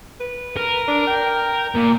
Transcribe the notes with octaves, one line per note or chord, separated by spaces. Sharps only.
B4
A#4
D4
G5
A#2